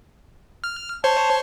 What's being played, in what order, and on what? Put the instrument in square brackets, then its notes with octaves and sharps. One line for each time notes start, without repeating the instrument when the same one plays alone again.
[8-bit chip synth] F6
[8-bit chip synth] C5 C#5 [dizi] A5